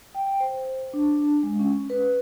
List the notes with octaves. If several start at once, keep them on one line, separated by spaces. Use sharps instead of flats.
G5
C5
D4
G#3
C#4
B4